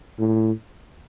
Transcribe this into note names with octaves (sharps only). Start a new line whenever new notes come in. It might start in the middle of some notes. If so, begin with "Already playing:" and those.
A2